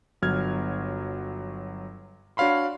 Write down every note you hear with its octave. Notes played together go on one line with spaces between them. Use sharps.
G1 F#3 F6 G#6
D4 F#4 C#5 F5 B5 C6